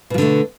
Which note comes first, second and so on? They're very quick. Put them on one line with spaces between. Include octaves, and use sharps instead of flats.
B2 F3 D3 A3